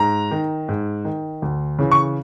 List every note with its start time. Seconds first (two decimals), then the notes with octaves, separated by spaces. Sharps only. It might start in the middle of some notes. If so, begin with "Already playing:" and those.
Already playing: G#2 A#5
0.31 D#3
0.69 G#2
1.05 D#3
1.42 D2
1.79 C#3 E3
1.92 C#6